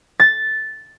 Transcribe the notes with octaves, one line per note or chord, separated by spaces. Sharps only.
A6